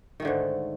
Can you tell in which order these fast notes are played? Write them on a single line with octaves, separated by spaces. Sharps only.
D#3 A3 D3 G#2